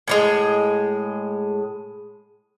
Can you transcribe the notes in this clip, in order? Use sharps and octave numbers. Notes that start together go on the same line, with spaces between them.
A2 E3 G#3